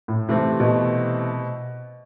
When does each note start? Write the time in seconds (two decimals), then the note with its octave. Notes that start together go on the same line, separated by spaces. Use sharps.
0.08 A2
0.29 C3 E3 A3 C4
0.60 B2